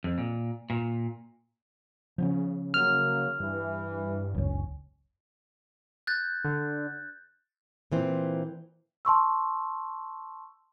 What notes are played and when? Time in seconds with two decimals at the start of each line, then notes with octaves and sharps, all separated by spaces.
0.04 F2
0.18 A#2
0.70 A#2
2.18 C#3 F3 B3 C#4
2.74 F#3 A#3 F6
3.40 G2 E3
4.34 F#1 C#2 C#4
6.07 F#6 G6 A6
6.44 D3
7.92 A#2 E3 C4
9.05 A5 C6 C#6 E6